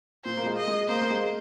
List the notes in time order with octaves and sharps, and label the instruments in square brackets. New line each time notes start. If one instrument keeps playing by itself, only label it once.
[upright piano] A#2 [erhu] C5
[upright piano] A#3
G#3
[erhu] D#5
[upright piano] G#3
[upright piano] A#3 [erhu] C5
[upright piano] A#3
G#3